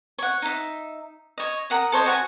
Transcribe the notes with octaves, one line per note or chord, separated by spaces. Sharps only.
C#5 F#5
D#4 E5
C#5 D#5
A#4 F#5 D#6
A4 C5 C#5 D#5
F#4 F#5 G#5